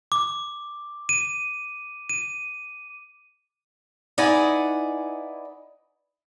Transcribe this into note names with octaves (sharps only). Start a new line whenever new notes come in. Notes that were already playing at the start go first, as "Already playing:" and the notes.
D6
D#7
D#7
D#4 E4 B4 D5 F#5 G#5